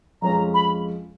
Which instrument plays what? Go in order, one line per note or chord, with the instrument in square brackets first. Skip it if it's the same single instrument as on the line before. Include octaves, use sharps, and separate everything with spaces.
[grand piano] F2 F3 G#3 C#4 F4 [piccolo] A#5
[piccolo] B5